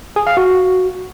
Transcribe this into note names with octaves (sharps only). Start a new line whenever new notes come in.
G#4
F5
F#4